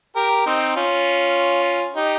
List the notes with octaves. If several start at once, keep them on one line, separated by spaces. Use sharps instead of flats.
G4 A#4
C4 D#4
C#4 F4
D#4 G4